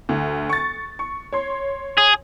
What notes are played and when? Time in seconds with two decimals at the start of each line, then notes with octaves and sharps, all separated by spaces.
0.09 D2
0.49 C#6 A6
0.99 C#6
1.33 C#5 C6
1.98 G#4